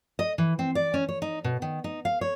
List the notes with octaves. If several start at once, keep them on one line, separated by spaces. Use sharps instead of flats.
D#5
E3
C4
D5
C#4
C#5
D#4
B2
D#3
D#4
F5
C#5